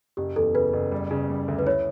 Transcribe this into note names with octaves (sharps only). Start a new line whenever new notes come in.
F#1 G4
E2 A4
C#3 B4
F#1
G3
C#3
G3
D2
B4
E4 C#5